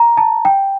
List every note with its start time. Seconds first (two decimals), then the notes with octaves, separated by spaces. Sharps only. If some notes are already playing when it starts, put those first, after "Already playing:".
Already playing: A#5
0.17 A5
0.45 G5